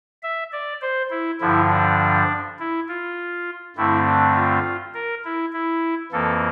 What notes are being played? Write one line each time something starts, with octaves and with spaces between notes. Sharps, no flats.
E5
D5
C5
E4
G2 D3 F3 E4
D4
E4
F4
G2 D3 A3 C4 E4
D4
F4
A#4
E4
E4
F2 E3 A#3 A4